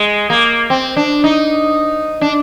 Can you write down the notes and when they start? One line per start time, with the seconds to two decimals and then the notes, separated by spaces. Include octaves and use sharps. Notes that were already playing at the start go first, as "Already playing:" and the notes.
Already playing: G#3
0.30 A#3
0.70 C4
0.97 D4
1.24 D#4
2.21 D4